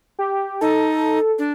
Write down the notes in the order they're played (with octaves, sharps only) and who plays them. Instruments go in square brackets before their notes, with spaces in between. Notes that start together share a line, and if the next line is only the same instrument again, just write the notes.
[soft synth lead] G4
[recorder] D#4 [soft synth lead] A4
[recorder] D4